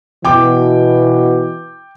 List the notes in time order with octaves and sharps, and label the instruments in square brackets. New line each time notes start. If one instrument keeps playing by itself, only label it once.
[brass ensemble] B2 [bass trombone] E3 [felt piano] G5 D6